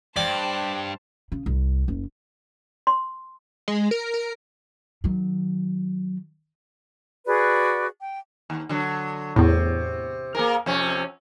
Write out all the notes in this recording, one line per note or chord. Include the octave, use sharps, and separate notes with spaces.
G2 C5 D5 G5 A5
C#3
C2
F#1
C6
G#3
A#4
A#4
D#3 F#3
F#4 G#4 B4 D5
G5
D#2
D3 F#3
E2 A2 C3
A#3 G#4 A#4
F2 C3 C#4